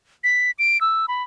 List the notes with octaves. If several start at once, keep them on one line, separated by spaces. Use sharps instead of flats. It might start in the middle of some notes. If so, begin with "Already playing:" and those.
B6
D7
E6
B5